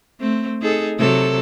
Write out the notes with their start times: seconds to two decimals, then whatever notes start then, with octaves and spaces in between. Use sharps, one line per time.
0.20 A3 C4
0.62 D#4 G#4 A4
0.98 C3 F#3 A4